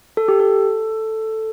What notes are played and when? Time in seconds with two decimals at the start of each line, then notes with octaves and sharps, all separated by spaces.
0.17 A4
0.28 G4
0.40 A4